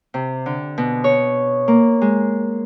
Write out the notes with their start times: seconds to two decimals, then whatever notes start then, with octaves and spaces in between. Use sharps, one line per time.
0.14 C3
0.46 D3
0.78 B2
1.04 C#5
1.68 A#3
2.02 G#3